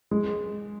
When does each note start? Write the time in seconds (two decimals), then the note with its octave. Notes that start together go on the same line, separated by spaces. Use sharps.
0.11 G#3